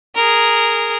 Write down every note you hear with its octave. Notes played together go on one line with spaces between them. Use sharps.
G#4 A#4